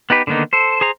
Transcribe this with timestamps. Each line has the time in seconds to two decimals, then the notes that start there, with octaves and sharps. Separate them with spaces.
0.10 B3 D#4 G4 B4
0.27 D3 D#3 A#3 B3 D#4
0.53 A4 C5
0.81 G#4 C5 A#5